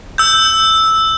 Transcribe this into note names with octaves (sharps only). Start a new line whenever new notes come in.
E6 G6